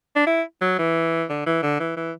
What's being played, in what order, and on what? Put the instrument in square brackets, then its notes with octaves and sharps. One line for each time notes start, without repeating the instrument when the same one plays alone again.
[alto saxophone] D4
E4
F#3
E3
D3
E3
D3
E3
E3